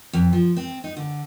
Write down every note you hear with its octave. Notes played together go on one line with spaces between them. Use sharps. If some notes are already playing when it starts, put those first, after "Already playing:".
F2
F3
C4
D#4
D3